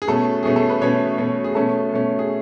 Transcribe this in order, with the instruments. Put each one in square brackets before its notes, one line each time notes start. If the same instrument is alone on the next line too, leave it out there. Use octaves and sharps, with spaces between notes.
[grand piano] G#4
B2 A3 C#4 A4
B2 A3 C#4 G#4
A4
B4
B2 A3 C#4 C#5
B2 A3 C#4
G#4
B2 A3 C#4 A4
B2 A3 C#4
G#4